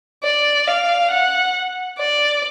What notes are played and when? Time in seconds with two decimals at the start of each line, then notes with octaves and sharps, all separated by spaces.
0.24 D5
0.67 F5
1.11 F#5
1.99 D5